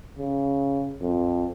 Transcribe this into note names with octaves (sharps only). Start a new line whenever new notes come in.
C#3
F2